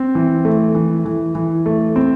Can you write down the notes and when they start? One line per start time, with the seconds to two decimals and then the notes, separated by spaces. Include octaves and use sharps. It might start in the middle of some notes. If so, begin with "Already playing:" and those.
Already playing: C4
0.15 E3
0.45 A3
0.75 E3
1.05 E3
1.35 E3
1.66 A3
1.96 C4